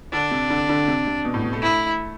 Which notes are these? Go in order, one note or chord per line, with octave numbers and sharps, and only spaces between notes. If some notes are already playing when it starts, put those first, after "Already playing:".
D3 D4
C3
D3
D3
C3
C3
B2
A2
B2
A3
E4